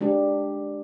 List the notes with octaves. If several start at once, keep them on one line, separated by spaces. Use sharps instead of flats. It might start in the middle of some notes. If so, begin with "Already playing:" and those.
G#3 D4 G4